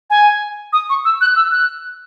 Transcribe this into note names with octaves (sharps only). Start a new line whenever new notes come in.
G#5
D#6
C#6
E6
F#6
E6
F#6